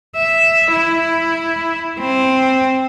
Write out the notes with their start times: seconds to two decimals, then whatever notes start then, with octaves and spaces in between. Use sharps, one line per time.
0.16 E5
0.72 E4
2.00 C4